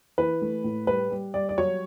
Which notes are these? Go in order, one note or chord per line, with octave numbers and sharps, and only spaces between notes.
E3 B4
A3
A2
G3 B4
G3
G3 D5
D5
F#3 C#5